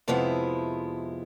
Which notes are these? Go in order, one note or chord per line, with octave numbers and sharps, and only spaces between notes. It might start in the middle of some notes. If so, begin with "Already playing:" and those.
F2 C3 F3 G#3 B3 E4